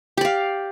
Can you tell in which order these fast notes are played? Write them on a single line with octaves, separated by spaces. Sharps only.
G4 D5 F5